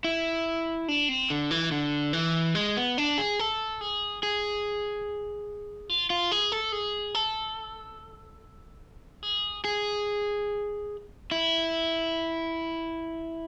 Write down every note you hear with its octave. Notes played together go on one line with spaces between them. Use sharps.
E4
D4
C4
D3
E3
D3
E3
G#3
B3
D4
G#4
A4
G#4
G#4
F4
F4
G#4
A4
G#4
A4
G#4
G#4
E4